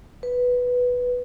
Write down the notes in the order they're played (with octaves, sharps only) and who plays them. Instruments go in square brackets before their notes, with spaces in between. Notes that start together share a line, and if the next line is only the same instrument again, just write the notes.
[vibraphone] B4